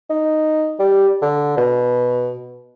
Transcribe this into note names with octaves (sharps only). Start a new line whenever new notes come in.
D#4
G3
D3
B2